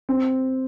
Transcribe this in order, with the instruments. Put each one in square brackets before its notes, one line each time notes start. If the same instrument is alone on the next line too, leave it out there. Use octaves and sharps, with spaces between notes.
[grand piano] C4